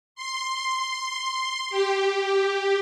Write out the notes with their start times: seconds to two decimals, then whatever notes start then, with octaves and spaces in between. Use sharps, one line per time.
0.15 C6
1.70 G4